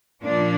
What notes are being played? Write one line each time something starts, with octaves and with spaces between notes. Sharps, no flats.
A#2 F3 A#3 D4